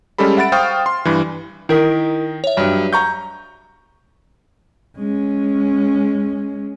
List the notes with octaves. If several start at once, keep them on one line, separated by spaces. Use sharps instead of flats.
G3 G#3 C#4 G4 A4 B5
E5 F#5 B5 A6 D7
C5 F5 G5 C#6 D#6 F6
C6
G2 E3
D#3 D#4 E4 A#4 B6
C#5 E5
G2 F#3
A#5 C#6 G6
G#3 C#4